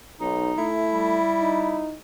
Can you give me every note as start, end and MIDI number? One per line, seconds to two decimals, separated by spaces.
0.20 0.52 35
0.20 0.68 63
0.58 1.19 57
0.58 1.98 64
0.94 1.80 55
1.42 1.95 63